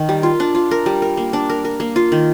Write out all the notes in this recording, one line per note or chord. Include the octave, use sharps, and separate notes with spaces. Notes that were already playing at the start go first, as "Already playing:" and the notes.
Already playing: D#3
G3
F4
D4
F4
A#4
G3
A#4
A#3
D4
A#4
A#4
A#3
F4
D#3